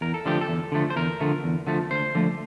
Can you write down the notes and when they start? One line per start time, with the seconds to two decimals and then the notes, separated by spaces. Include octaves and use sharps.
0.01 E2 A#4
0.14 A4
0.26 D3 F3 A3 G4
0.41 A4
0.48 E2
0.72 D3 F3 A3
0.90 C5
0.96 E2 A#4
1.20 D3 F3 A3
1.44 E2
1.67 D3 F3 A3
1.91 D2 C5
2.15 D3 F3 A3